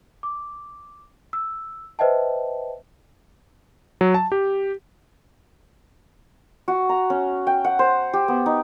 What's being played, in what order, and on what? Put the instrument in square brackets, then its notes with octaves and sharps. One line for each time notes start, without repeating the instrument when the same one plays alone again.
[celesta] D6
E6
B4 C5 D#5 E5 G5 A5
[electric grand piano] F#3
A5
G4
[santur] F#4
A#5
C#4
G5
F#5
C5
G4
B3
D#4